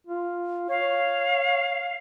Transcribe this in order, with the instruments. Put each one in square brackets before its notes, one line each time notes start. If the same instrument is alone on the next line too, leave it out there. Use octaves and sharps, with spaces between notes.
[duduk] F4
[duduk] C#5 [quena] F5